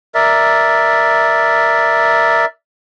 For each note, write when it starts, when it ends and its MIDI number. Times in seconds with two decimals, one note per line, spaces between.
0.15 2.45 70
0.15 2.45 74
0.15 2.45 76